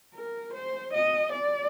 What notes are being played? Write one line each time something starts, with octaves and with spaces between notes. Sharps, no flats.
A#4
C5
D#5
D5